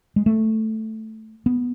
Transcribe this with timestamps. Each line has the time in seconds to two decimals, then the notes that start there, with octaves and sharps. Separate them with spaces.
0.16 G#3
0.26 A3
1.46 B3